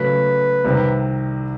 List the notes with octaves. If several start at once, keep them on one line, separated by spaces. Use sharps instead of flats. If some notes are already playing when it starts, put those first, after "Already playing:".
Already playing: C#3 F#3 A3 B4
C2 C3 D#3